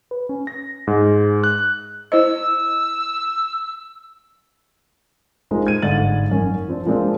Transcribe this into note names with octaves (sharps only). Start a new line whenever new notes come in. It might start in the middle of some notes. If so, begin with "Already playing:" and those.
B4
C#4
A#6
G#2
F#6
E4 C5 D#5 E6
G#3 D#4 F4 G#4 A#4 C5
G#6 D#7
G1 G#2 D5 A6 F#7
F#2 D#3 C#4
F3 C4 D4
F3 G#3 A#3 C4 D4 F4